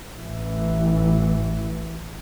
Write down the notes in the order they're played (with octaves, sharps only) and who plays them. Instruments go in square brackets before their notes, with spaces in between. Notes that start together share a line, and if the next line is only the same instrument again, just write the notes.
[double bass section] A1 E3